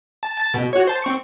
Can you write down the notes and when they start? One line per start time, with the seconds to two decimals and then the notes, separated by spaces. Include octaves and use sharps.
0.23 A5
0.37 A5 A6
0.54 B2
0.73 F#4 C#5
0.87 C5 A5
1.02 C4 C#6 C#7